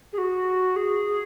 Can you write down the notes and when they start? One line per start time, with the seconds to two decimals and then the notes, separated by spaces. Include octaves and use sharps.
0.13 G#4
0.18 F#4
0.76 G#4